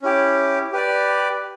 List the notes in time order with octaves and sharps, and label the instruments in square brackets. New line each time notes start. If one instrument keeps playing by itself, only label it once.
[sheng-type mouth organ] C#4 E4 G4
G4 B4 D5